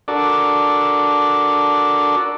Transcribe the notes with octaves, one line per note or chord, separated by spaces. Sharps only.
D4 F#4 A4 A#4 D5